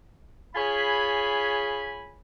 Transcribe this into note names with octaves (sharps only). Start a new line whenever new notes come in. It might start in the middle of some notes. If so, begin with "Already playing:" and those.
F4 G#4 C#5 G#5 B5